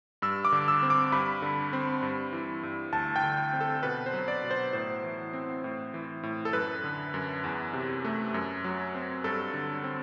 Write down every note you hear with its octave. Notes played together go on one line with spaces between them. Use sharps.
G2 E6
D6
D3
E6
C4
D6
G2 B5
D3
C4
G2
E3
G2
D2 A5
G5
D3
C4
A4
B2 B4
C5
F#3
D5
B2
C5
A2 C5
E3
C4
A2
E3
A2
A4
F#2 B4
D3
F#2
E2
C3
A3
F#2
F#3
C4
G2 A4
D3
C4